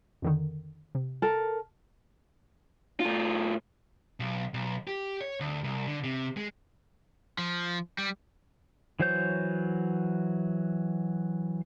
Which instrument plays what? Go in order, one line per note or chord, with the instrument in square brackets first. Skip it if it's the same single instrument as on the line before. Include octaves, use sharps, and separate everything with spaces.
[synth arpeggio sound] F2 D3 D#3
C3
[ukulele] A4 A#4 A5
[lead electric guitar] A2 F4
B1
B1
G4
C#5
D2
C2
D3
C3
G#3
[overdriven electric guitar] F3
G3
[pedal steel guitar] E3 F#3 C5 C#5 G6